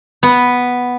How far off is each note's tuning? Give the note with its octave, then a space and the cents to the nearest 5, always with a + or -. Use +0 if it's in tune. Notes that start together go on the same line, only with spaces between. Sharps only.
B3 +0 B4 +0